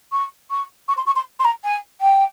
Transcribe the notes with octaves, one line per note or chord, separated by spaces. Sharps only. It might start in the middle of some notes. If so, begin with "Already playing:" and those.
C#6
C#6
C#6
C6
C#6
C6
C6
A#5
G#5
G5